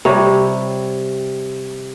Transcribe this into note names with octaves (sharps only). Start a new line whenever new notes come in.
C3 G3 C#5